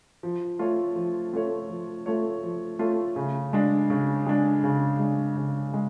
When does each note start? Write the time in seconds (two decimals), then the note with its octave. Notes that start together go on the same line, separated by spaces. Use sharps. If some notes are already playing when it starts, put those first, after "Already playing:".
0.23 F3
0.59 A3 F4 A4 C#5
0.96 F3
1.33 A3 F4 A4 C#5
1.70 F3
2.06 A3 F4 A4 C#5
2.43 F3
2.79 A3 F4 A4 C#5
3.16 C#3
3.53 G#3 D4
3.90 C#3
4.26 G#3 D4
4.64 C#3
4.99 G#3 D4
5.37 C#3
5.73 G#3